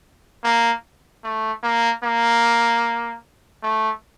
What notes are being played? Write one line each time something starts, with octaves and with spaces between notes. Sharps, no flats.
A#3
A3
A#3
A#3
A3